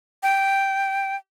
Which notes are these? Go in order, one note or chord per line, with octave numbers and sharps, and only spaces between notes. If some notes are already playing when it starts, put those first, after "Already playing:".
G5